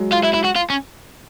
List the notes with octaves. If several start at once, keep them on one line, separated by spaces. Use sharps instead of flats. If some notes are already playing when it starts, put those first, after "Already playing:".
Already playing: F#3 G#3
F4
E4
E4
F#4
F4
C#4